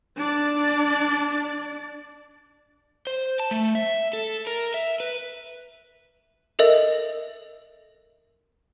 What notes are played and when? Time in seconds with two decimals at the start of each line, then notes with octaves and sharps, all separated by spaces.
0.16 D4 D5
3.07 C5
3.40 A5
3.51 A3
3.75 E5
4.13 A4
4.47 A#4
4.74 E5
5.00 B4
6.59 A4 A#4 D#5 E5